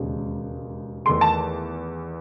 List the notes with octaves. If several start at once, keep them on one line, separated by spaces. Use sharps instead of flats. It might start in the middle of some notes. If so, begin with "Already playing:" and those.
Already playing: E1 D#2 C#3 G#3
E2 D#3 A3 C6
A5